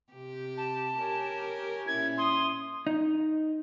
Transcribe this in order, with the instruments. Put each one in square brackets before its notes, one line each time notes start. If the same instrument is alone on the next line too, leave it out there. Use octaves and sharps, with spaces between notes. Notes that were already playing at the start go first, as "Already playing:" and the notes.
[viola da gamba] C3 G4
[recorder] A5
[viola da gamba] G4 A#4 [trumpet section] C#5 G#5
[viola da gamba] A#2 C#4 E4 [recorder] G#6
[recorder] C6 [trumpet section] D#6
[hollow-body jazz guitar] D#4